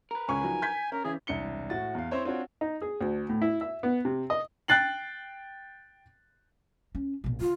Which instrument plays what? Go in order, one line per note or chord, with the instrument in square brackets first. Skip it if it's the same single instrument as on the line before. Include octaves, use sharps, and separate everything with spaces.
[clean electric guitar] A#4 B4
[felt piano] C#2 C#4 C#6 [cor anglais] G#5
[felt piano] F3 F#3 D#4
G6 G#6 B6
[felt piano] C#4 [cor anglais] A#4
[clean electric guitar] C#3 C#4 [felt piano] E3 [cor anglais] G#4
[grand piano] E1 C2 D4 C#7 G7
A2 F#4 A6
E2 F5
C4 E4 C5 C#5
C4 D4 F4 F#4 C5 C#5
[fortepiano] D#4
G#4
D2
A2
E4
E5
B3
C3
D#5
[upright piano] G5 F#6 A6 C7 F#7
[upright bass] C#4
A#1 B2
[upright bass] D3 [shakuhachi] F4